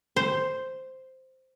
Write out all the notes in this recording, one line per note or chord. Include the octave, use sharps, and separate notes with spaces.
C5